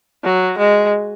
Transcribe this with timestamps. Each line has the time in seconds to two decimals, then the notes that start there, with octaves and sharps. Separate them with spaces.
0.24 F#3
0.58 G#3